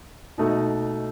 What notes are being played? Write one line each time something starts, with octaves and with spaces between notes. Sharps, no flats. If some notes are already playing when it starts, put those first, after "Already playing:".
B2 A3 D#4